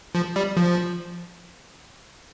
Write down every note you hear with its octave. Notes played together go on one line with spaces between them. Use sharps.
F3
G3
F3